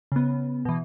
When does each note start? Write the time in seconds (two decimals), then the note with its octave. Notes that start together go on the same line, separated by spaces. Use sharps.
0.12 C#3 B3
0.65 B2 E3